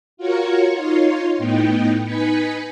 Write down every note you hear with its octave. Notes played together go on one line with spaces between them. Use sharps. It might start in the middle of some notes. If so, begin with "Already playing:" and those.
F4 F#4 A#4 C#5 C#6
D#4 F4 C#5 C6
A2 B3 D#4 G5
D#4 B4 G#5 B6 C#7